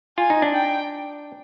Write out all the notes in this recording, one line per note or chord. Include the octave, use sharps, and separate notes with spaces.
F4 G#5
D#4
D4
G5